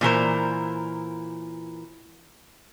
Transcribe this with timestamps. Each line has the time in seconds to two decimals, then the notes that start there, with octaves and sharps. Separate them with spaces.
0.01 A#2 E3 A#4 C5